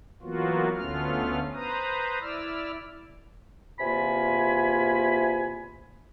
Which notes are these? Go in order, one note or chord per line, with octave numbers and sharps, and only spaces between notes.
E3 F#3 A#3 B3 F4 F#4
D2 A3 B3 C#4 F4 F6
B4 C5 A#5 D#6
E4 D5 E6 F6
E2 C3 A#3 F4 G#5 B5